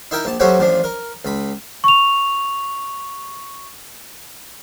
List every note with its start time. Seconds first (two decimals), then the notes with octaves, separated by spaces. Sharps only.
0.11 D#4 E4 A#4 G5
0.25 A#1 A5
0.40 F#3 A3 C4 C#4 F#4 G4
0.58 A1 F3 D4
0.84 A#4
1.25 C#2 B5
1.84 C#6 F7